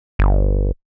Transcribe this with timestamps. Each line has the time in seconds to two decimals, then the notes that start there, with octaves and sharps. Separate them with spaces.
0.19 G1